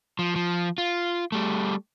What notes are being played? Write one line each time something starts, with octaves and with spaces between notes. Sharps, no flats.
F3
F3
F4
G3 A3